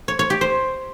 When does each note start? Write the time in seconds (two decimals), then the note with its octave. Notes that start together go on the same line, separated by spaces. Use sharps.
0.08 C#5
0.19 C#5
0.30 G4
0.41 C5